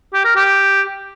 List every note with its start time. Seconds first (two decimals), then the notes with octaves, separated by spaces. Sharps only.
0.13 G4
0.24 A#4
0.36 G4